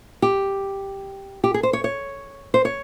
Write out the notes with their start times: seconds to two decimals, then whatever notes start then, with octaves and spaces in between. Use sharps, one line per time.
0.22 G4
1.44 G4
1.54 G#4
1.63 C5
1.73 C#5
1.84 C#5
2.54 C5
2.65 C#5